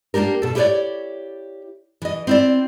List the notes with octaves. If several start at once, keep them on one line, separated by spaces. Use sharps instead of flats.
A#3 B3 D4 G4 A#4
B2 A4
E4 G4 A#4 B4 C#5 D5
E3 D#5
C4 E4 D5